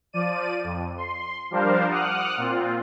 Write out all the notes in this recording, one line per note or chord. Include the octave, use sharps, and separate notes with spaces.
F3 D5 D#7
F2
C6
F3 G3 D4 A#4 C5 F5
F#5 D6 D#6 F6 F#6
A#2 C4 F4